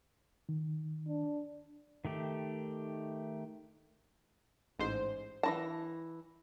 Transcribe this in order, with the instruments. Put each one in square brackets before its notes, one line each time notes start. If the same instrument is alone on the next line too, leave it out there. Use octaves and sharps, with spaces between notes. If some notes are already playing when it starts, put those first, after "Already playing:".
[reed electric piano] D#3
[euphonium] D4
[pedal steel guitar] D#3 A3 G4
[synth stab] A1 G#2 C5
[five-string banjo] E3 E4 A5 [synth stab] A#6